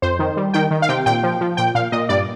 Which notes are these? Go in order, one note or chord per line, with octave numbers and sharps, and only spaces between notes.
F2 C5
D#3
G3
D#3 G5
D#3
F5
C3 G5
A#2 G5
F3
F3
A#2 G5
A#2 F5
A#2 D#5
G2 D5